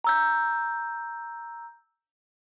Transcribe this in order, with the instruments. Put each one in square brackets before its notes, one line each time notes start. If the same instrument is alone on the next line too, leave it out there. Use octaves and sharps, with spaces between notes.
[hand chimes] A#5 E6 G6